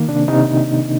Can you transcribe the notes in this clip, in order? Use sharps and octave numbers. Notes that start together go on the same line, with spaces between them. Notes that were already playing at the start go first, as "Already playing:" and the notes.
Already playing: D#3 A#3
C3 D4
C3 D#4